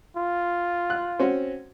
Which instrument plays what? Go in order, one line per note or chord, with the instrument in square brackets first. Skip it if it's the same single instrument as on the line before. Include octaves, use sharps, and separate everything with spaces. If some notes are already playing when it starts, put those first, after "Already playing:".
[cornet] F4
[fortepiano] F#6
C4 C#4 F#4